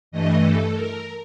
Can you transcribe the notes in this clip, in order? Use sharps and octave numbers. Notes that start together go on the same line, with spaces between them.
G2 E3 A3 D#5
A4
A#4